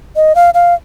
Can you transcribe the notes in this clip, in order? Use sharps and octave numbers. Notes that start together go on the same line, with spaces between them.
D#5
F5
F5